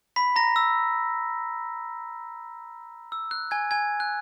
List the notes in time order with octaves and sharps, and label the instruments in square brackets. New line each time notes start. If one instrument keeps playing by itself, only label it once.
[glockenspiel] B5 B6
A#5 A#6
E6
E6
F#6
G#5 G#6
G#5 G#6
F#6